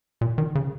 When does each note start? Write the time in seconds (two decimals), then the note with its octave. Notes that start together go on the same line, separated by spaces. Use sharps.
0.21 A#2
0.38 D#3
0.55 C#3